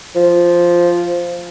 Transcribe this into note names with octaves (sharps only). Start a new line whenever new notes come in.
F3